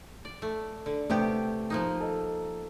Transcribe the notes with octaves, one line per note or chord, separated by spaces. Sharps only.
D5
A3
D3
C3 A3 B3 G4 G5
F3 A#3 D#4
A4 D#5